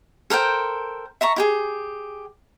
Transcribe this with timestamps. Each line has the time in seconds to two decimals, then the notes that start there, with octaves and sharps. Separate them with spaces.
0.30 A4 A#4 C5 G5
1.21 E5 A5 A#5 C#6
1.36 E4 G4 G#4